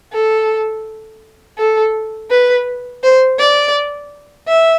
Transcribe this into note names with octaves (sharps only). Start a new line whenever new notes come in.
A4
A4
B4
C5
D5
E5